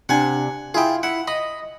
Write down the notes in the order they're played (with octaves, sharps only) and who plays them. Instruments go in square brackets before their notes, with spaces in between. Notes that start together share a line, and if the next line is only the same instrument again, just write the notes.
[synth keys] C3 D4 [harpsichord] F#5 G#5
[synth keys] E4 F4 [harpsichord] G#4 G5
[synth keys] E4 [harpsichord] F#5
[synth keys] D#5 [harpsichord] B5